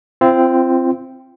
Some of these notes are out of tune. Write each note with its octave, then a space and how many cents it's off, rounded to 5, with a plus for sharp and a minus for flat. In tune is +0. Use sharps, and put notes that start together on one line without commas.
C4 +0 F4 -35